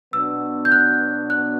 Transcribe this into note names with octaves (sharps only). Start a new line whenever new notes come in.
B2 F#3 B3 D4 F#4 E6
G6
F#6
F#6